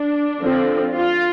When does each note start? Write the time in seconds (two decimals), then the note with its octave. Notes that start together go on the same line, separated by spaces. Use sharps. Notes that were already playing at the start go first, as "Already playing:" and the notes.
Already playing: D4
0.41 D3 F3 C4
0.95 F4